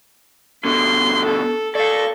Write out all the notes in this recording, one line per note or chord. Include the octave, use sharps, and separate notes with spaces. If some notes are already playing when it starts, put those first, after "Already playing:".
B2 D3 C6
A4
A4 D5 F5 C#6